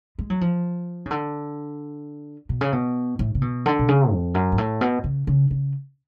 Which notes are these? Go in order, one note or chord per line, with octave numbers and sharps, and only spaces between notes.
G#3
F#3
F3
C#3
D3
B2
C#3
B2
A2
C#3
B2
D3
B2
C#3
F2
F#2
G#2
A2
B2
C#3
C#3
C#3